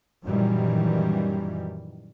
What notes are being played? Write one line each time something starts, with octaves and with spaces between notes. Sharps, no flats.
F#2 A#2 D#3 E3 G3